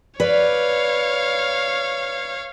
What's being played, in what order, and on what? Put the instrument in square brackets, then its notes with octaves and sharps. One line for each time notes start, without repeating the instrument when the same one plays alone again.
[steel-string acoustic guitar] B4 D5 [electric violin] C#5 F5